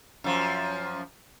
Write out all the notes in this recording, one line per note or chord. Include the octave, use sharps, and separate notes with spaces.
F#2 F3